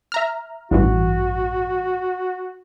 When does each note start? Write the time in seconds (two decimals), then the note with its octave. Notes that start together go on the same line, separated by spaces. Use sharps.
0.12 E5 A#5 F6
0.71 A1 G2 E3 F#4